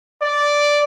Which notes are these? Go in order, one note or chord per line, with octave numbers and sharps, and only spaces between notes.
D5